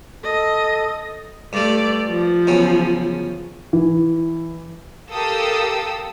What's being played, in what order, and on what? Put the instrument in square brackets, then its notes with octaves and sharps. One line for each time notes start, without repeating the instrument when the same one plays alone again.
[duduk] A4 [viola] D#5
[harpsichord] G2 G3 [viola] A3 D5
[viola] F3
[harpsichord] E2 C#3 F#3
[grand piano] E3
[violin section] G4 A4 A#4 F5 D#6 E6